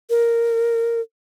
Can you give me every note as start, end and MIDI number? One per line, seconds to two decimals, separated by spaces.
0.10 1.00 70